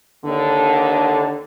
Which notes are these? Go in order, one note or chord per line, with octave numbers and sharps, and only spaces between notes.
D#2 D3